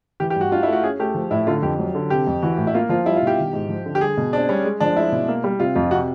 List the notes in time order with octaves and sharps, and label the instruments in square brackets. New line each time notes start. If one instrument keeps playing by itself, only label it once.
[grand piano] E3 [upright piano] G4
[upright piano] G4
[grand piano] G2
[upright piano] F#4
[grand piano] D4 [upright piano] F4
[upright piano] E4
[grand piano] A3
[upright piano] F#4
[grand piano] C#4 [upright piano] G#4
[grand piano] A3 [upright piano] G4
[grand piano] F3
[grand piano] A2 [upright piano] E4
[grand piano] D3 [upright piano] F4
[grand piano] F2 [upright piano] G4
[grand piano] F#3
D3
[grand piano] C3 [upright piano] G4
[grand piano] F2
[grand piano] E3 [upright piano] F#4
[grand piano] A2
[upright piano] E4
[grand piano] A#3 [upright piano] F4
[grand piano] F3 [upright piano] F4
[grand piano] G3 [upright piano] E4
[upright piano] F4
[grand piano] B2 [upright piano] G4
[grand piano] D#3
G#2
F3
D3
[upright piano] G4
[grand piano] G3 [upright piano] G#4
[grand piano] B2
[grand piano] C4 [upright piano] D4
[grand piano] G3 [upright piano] C#4
[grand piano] G#3
[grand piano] F3 [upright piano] D4
[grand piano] G#3 [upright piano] E4
[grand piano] B2
A#3
G3
[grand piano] C3 [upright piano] F4
[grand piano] F2 [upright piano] F4
[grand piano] C3 [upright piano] F#4